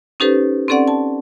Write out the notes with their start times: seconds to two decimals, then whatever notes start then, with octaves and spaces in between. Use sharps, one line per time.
0.20 C#4 D#4 G4 A4 B4 C5
0.68 C4 C#4 A4 D5 F#5
0.88 A5